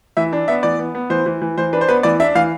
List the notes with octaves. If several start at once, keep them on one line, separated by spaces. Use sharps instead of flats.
E3 E5
D4
B3 E5
E3 D5
B3
B3
E3 C5
E3
E3
E3 C5
D4 B4
C5
B3 B4
E3 D5
D4 E5
E3 F5